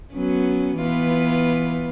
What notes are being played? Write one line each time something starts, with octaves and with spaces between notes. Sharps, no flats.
F#3 B3 C#4
E3 B3 F4